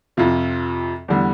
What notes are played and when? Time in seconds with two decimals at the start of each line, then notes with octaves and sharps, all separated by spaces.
0.17 F2 C3 F3 F4
1.08 E2 D3 G3